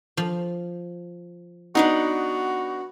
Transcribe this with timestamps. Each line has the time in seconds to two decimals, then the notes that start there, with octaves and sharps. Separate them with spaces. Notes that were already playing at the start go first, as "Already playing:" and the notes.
0.17 F3
1.75 B3 D4 D#4 F#4 F#5